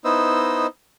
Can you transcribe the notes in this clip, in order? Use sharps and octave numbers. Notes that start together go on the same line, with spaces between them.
B3 D#4 E4 C5 D#5 E6